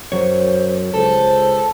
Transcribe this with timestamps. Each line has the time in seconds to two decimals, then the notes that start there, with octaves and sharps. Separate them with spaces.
0.12 F#2 F#3 C5 C#5
0.94 C#2 A4 C5